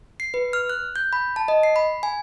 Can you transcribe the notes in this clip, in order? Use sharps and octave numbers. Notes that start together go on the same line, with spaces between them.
C7
B4
F6
F#6
G6
B5
A5
D#5
C7
B5
G#5